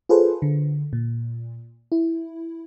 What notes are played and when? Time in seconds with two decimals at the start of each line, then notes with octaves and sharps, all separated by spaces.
0.09 F4 G#4 A4 B4 C5
0.42 D3
0.93 A#2
1.92 E4